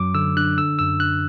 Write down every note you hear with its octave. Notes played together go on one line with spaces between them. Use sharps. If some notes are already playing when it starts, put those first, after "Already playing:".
Already playing: F#2 F#3 D6
D3 E6
D4 F#6
D3 E6
F#2 E6
D4 F#6